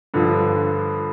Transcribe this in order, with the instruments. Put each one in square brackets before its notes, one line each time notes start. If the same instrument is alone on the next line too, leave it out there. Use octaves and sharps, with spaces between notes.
[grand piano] G2 D3 F3